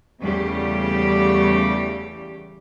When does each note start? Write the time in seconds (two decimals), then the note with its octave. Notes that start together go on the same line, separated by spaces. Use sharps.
0.22 E2 C#3 G3 A3 G4